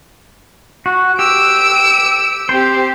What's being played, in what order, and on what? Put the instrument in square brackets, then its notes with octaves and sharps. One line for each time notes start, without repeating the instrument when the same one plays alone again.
[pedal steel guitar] F#4
[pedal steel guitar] G4 [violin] E6 D7
[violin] C4 G4 [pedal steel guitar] C5